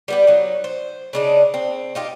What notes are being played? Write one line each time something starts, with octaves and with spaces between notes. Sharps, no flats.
G3 B3 G4
F#3 D#4
C5
C#3 D4 D#4
C4
D#4 F4 G4